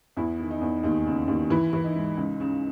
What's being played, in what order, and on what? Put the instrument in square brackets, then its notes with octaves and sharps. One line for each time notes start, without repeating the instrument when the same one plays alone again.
[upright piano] E2 E4
D#3
D#4
E2
D#2 D#4
C#3
D#2
E3 E4
E3
D#4
G#2
C#2
C#3